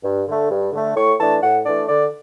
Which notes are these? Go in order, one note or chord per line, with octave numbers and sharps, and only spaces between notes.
G2
D3 A3
G2
D3 A3
A2 C#6
E3 A3 D4 A5
A2 F#5
E3 A3 D4 D5
D3 D5